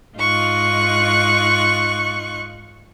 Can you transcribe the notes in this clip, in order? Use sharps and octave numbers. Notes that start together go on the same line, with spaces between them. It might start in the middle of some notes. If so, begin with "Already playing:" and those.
G#2 D#4 F4 C#6 F#6